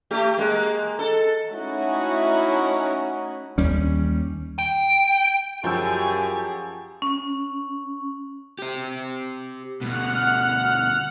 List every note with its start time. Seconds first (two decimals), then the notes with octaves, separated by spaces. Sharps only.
0.11 A3 G4
0.38 G#3 A#3
0.99 A4
1.50 A3 C#4 D#4 E4 F#4
3.58 D#2 G3 C#4
4.59 G5
5.64 F#2 F3 G4 G#4 G5 C#6 E6
7.02 C#4
8.59 G4 C5
9.81 D2 B2 F#5 F6